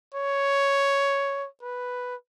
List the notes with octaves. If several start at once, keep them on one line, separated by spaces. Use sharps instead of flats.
C#5
B4